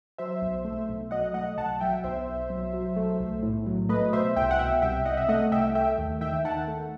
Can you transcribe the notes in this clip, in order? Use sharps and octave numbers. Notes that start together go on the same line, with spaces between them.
F#3 C5 E5
B1
A3
B1
F#3 D#5 F#5
A3 D#5 F#5
B1 F#5 A5
F#3 E5 G5
B1 C5 E5
B1
F#3
F#3
A3
B1
A2
F#3
A3 B4 D#5
B2 C5 E5
C2 E5 G5
F#5
B2 E5 G5
C2 E5 G5
C2 D#5 F#5
E5
A3 D#5 F#5
C2 E5 G5
A3 E5 G5
D#2
D#3 E5 G5
D#3 F#5 A5
A3